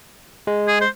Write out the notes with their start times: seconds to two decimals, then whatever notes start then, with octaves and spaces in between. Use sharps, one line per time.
0.47 G#3
0.68 G#4
0.82 C5